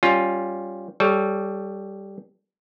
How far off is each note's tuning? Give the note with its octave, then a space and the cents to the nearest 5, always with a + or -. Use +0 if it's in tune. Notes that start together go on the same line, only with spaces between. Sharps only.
G3 +0 C#4 -5 F4 +10
G3 +0 A4 -25 C#5 +5